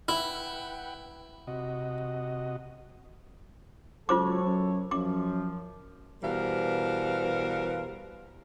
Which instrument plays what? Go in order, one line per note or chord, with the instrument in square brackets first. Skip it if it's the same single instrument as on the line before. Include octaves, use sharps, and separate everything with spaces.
[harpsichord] E4 [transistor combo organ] B4 F#5 G5
[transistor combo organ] C3 F#4 D#5
[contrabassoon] C#2 [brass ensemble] F#3 A4 C#5 [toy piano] F4 C5 D6
[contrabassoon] F#2
[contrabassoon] F#2 [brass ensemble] F3 [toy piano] D6
[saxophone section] B2 E3 G3 A#4 C5 F5